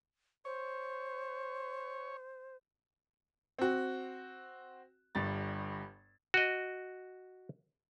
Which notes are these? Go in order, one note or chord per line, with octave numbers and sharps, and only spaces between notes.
C5 C#5
C4 F#4
G1 G2 A6
F#4 D#5